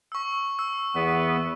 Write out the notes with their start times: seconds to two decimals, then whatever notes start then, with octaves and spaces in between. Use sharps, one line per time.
0.12 C#6 E6
0.59 E6
0.95 E2 B3 B4